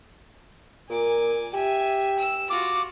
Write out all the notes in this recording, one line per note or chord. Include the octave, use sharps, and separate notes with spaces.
A#2 G#5 D6
G4 E5 G#5
E6
F4 F#4 D6